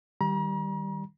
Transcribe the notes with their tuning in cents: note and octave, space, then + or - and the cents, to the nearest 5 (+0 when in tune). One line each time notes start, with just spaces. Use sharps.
D#3 +0 G3 +0 A#5 +40